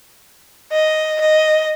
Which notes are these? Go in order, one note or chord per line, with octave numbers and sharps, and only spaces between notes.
D#5
D#5